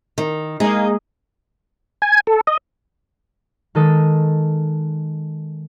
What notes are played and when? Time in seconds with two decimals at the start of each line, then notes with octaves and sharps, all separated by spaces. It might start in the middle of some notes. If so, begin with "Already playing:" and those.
0.18 D#3
0.60 G#3 A#3 D#4 G#4 D#5
2.02 G#5
2.27 A4
2.47 D#5
3.75 D#3 G#3 A4 D#6 A6